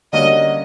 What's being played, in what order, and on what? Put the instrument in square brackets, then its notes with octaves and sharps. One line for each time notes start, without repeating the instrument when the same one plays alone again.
[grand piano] D3 G3 A#3 C#4 F#4 [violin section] D#5